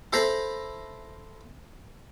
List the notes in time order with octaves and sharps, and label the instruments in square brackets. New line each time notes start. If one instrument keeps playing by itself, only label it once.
[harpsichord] E4 A4 C5 A#5 B5